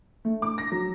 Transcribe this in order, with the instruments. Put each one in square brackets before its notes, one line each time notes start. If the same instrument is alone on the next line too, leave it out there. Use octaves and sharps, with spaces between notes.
[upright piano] A3
D6
A#6
F#3